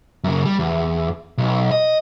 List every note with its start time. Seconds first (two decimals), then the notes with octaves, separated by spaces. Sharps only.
0.24 F#2 C#3
0.45 G3
0.59 E2
1.38 B1
1.71 D#5